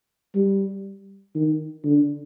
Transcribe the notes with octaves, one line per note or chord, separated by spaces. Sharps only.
G3
D#3
D3